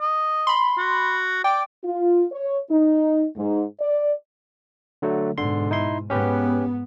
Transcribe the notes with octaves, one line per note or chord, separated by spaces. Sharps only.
D#5
B5 C6
F#4
D5 G5
F4
C#5
D#4
G#2
D5
D3 F#3 A3
G#2 B2 D3 C6
D#4 E4 C6
G#2 B3 C#4 G4 B4